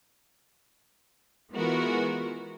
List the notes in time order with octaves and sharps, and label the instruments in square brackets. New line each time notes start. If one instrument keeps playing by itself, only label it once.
[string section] E3 G#3 B3 F4 F#4 A#4